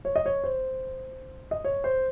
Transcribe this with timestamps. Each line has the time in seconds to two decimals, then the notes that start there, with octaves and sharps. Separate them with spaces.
0.05 C#5
0.16 D#5
0.26 C#5
0.44 C5
1.51 D#5
1.65 C#5
1.84 C5